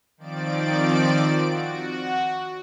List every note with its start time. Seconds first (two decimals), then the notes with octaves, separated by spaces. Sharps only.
0.18 D#3 F3 C4 D5 D7
1.44 F#4